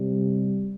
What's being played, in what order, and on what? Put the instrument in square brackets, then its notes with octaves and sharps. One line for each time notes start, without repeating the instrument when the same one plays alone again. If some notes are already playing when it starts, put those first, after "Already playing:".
Already playing: [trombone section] C3 G3